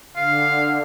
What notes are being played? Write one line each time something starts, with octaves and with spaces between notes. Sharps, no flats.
D3 F5